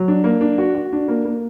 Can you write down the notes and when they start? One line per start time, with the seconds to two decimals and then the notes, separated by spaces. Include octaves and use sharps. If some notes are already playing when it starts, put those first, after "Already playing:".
Already playing: F#3
0.08 D4
0.24 A#3
0.41 D4
0.58 F#4
0.75 F#4
0.93 D4
1.08 A#3
1.25 A#3